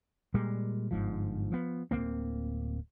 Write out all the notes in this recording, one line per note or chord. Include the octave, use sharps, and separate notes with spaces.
A#2 G3 G#3
G1 G#2 F3
F3 B3
D1 A#2 A#3 C4